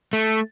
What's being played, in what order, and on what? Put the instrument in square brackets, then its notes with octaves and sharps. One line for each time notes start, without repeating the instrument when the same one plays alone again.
[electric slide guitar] A3